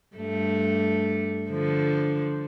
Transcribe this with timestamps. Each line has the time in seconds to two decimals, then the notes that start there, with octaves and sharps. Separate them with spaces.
0.16 G2 A3
1.49 D3 F3